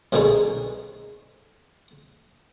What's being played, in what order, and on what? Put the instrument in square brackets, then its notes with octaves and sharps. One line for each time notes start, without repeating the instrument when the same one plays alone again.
[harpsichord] C2 B2 D3 D#4 G#4 C#6